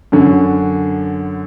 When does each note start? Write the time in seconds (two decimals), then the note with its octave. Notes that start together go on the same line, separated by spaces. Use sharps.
0.12 F#2 D3 F#3